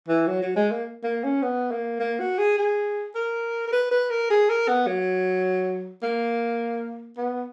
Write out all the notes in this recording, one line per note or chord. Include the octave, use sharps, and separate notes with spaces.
E3
F#3
F#3
G#3
A#3
A#3
C#4
B3
A#3
A#3
F#4
G#4
G#4
A#4
A#4
B4
B4
A#4
G#4
A#4
B3
F#3
A#3
B3